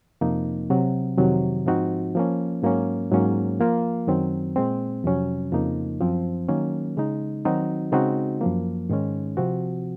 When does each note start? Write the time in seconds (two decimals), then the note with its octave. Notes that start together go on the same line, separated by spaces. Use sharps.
0.21 F2 C3 F3 A#3 D#4
0.70 C3 F#3 C4 F#4
1.18 F2 C3 D#3 F#3
1.66 G#2 F3 C4 D#4 F#4
2.15 F3 A#3 C#4
2.63 G#2 F#3 A#3 C#4
3.11 G#2 F#3 A#3 C#4
3.60 F3 A#3 F4
4.07 F#2 D#3 F#3 C4
4.56 A#2 G#3 C4
5.04 F2 C3 F#3 C#4
5.52 F2 C#3 F3 A#3 D#4
6.01 F#2 F3 C4
6.49 D#3 F#3 A#3 C#4
6.97 C#3 G#3 D#4
7.45 D#3 F#3 C4 D#4 F#4
7.92 C#3 G#3 C4 D#4 F#4
8.41 F#2 F3 A#3
8.89 G#2 D#3 G#3 C#4
9.37 C3 F3 C4 F#4